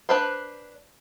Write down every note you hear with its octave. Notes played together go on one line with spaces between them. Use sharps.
D4 B4 C5